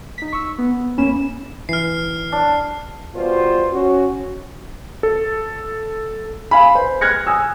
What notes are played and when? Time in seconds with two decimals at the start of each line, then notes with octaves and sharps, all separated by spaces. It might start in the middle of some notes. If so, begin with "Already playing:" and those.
0.18 D#4 B6
0.33 C#6 E6
0.58 B3
0.97 E2 A#3 C#4 B5 E7
1.69 E3 F6 C7
2.32 D4
3.15 B2 G3 F4 C5
3.72 C#4 F#4
5.03 A4
6.51 F5 G#5 B5
6.75 B4 C5
7.01 F6 F#6 G#6 A#6 C#7
7.27 G#5 D#6 E6